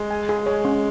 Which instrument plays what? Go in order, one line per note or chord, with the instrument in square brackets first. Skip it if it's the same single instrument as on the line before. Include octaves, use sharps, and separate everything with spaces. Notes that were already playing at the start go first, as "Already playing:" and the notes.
Already playing: [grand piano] G#3
[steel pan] G#5
G#4
[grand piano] G#3 [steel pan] C#5
[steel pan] C#4